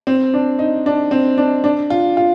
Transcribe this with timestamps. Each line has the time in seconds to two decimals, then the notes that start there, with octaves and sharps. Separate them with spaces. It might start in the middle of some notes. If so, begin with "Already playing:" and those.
0.07 C4
0.34 D4
0.59 D#4
0.86 D4
1.11 C4
1.38 D4
1.64 D4
1.90 F4
2.17 F4